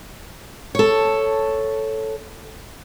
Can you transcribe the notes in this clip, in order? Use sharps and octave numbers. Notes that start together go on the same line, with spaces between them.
A4 C#5